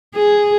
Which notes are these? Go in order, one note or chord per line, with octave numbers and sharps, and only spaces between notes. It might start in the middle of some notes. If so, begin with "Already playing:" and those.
G#4